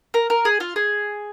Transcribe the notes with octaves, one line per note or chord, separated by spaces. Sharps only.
A#4
A#4
G#4
F4
G#4